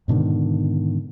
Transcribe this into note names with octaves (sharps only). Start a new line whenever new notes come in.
G#2 B2 D3 D#3